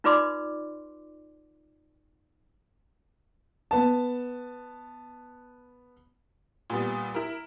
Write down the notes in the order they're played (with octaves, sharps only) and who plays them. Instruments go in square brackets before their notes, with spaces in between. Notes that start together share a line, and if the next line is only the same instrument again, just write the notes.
[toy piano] D#4 F4 B4 D5 C6 D6
[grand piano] B3 A5
[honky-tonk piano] A#2 G3 B3
E4 A#4